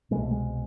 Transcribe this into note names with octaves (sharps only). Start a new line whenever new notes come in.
C2 B2 G#3
A3
G#3